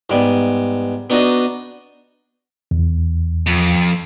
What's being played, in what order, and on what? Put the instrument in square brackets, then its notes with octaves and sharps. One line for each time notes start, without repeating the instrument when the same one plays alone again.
[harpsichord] G#2 G3 B3
B3 D4 D#4 F#4 D#5 D#6
[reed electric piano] E2
[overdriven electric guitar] F2